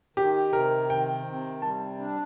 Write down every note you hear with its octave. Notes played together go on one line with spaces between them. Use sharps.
D#3 G4
C3 A#4
D#3 G5
C3
G3 A5
D4